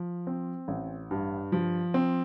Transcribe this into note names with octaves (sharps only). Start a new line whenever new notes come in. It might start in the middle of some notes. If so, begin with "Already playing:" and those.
Already playing: F3
C4
A1
G2
F3
C4